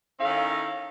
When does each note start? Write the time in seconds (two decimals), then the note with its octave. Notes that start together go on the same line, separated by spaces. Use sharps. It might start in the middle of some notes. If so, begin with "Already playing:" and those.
0.20 D#3 C#4 E4 A4 F5